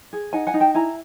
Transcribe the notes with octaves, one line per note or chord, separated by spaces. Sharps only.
G#4
D#4 F#5 G#5
F#5 G#5
D#4
G5 A5
E4 G#5 A#5